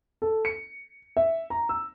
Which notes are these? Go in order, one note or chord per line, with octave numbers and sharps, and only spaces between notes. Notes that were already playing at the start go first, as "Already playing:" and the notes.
A4
C#7
E5
A#5
E6